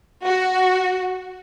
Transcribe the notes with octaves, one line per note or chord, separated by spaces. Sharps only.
F#4